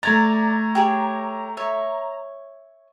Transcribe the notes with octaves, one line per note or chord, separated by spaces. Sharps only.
A3 D5 A#5 G#6 A6
G4 G#4 C#5
C#5 E5